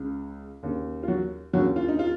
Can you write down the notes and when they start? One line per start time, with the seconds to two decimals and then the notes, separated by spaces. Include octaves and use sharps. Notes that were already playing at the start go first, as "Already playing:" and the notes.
Already playing: C#2 C#3
0.63 D#2 C#3
1.03 F4
1.08 F#3 F#4
1.53 D#2 C#3 F#3 F#4
1.76 F4
1.89 D#4
1.99 F4